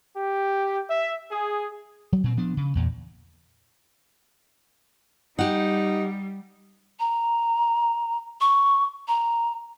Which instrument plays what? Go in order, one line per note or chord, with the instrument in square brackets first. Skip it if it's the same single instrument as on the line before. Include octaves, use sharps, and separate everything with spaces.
[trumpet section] G4
E5
G#4
[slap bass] F#3
A#2 C4
F3 B3 D4
C#3
E2 A#2
[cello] G3 [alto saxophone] D#4 [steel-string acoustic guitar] G4 F#5
[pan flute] A#5
C#6
A#5